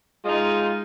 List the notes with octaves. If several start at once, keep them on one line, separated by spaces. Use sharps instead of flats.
G#3 D#4 F4